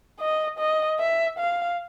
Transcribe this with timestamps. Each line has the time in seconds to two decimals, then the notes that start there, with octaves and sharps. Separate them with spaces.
0.20 D#5
0.59 D#5
0.99 E5
1.39 F5